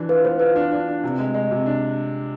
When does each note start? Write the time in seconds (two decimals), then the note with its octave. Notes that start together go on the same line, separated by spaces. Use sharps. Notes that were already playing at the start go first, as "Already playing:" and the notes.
Already playing: E3 D4
0.09 F4 B4
0.25 B3 C5
0.40 F4 B4
0.56 D4
0.72 D4
0.88 D4
1.04 C3
1.19 G#3
1.34 G#3
1.51 C3
1.66 D4